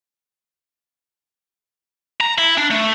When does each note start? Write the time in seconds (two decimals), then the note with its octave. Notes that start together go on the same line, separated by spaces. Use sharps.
2.21 A#5
2.38 E4
2.58 D4
2.71 A3